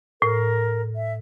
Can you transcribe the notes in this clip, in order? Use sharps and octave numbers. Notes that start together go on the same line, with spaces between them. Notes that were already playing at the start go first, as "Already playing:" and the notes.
A2 A#4
E5